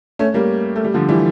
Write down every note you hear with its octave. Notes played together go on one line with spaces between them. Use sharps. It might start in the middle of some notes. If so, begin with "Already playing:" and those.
A3 C#4
G3 A#3
A3
G3
D3 F3
E3 G3